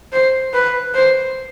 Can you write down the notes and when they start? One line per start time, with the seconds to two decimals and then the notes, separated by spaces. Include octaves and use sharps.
0.13 C5
0.54 B4
0.95 C5